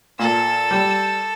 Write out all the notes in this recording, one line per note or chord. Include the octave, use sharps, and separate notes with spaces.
A#2 A4 E6
G3